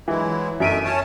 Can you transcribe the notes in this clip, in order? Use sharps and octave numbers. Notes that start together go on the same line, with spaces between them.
E3 F#3 G#3 E4
F#2 B2 A3 E5 D7 D#7
C#4 C#5 A5